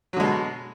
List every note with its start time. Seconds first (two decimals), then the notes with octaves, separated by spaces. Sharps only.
0.13 F#3
0.16 D3
0.20 G#3
0.23 B2